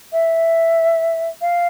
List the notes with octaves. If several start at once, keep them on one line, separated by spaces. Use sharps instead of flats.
E5
F5